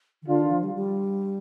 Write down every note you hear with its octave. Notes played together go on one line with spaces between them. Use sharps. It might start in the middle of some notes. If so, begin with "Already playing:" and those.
D#3
D3 D4 F4
D#3
F3
G3
G3